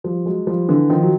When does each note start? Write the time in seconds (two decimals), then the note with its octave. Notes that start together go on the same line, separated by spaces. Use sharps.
0.04 F3 G3
0.25 F#3 G#3
0.47 F3 G3
0.68 D3 E3
0.90 D#3 F3
1.03 F#3